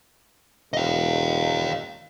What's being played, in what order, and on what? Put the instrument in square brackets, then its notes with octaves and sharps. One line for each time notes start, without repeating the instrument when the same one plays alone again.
[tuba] E1 [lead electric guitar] D#5 F5